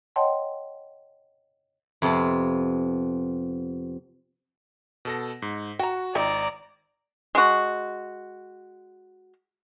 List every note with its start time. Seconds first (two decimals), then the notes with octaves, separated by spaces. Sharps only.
0.16 C#5 D#5 F#5 G5 A5 C6
2.02 F2 C3 B3 F4
5.05 B2 A4 A#6
5.42 G#2
5.79 F#4 G5 A#5
6.15 G#1 C4 D#4 F4 D5 A#5
7.35 G#3 F#4